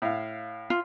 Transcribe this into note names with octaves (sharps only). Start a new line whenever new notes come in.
A2 F5
F4